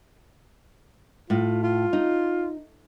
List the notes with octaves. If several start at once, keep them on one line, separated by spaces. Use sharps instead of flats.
A2 F4
F4
D#4